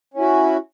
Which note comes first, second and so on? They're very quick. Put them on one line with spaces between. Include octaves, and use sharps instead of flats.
C#4 E4 F#4